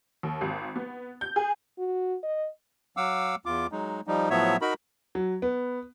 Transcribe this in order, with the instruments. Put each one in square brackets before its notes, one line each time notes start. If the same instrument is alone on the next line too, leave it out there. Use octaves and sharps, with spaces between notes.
[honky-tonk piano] D#2
G#1
B3
G6
G#4
[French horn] F#4
D#5
[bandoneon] F#3 F5 F#5 D6 E6
E2 F4 D6
F#3 G#3 D#4
F3 G3 D#4
A2 F3 F#3 B3 C#5 E5
D#4 F#4 A#4 B5
[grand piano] F#3
B3